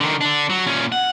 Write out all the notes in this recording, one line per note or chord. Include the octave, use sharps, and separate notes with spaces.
D3 D#3
D3 D4
F#3
A#2 C#4
F#5